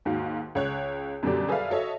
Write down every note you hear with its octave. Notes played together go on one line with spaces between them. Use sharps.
D#2 G#2 F#4 F5
C#2 C#5 F#6
F#2 B2 D3 G3 G4 D5
G#4 A4 B4 D5 E5 F5
F#4 A4 C#5 D#5 E5